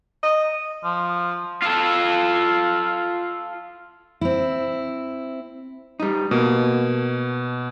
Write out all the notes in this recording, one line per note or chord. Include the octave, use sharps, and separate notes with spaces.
D#5
F3
F4 A4
C4 E4
G3 D#4
B2 A#3